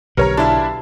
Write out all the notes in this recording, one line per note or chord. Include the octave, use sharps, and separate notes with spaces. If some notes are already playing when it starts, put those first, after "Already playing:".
B1 D3 G4 A#4 B4 C#5 A#5
D4 E4 F#4 A4 E5 F5